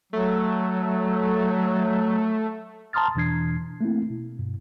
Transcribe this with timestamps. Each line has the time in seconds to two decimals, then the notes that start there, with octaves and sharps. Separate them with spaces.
0.13 F#3 A3
2.93 A5 A#5 C6 D#6 F6 A6
3.15 E2 B2 E3 D4 G#6 C7
3.81 A3 A#3 C4 E4
4.10 B2
4.39 G2 B2